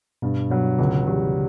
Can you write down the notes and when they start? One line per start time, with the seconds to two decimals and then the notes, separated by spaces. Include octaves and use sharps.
0.22 G2 B2
0.50 B2 F#3
0.79 C#2 B2 D3
1.07 C#3 E3 G3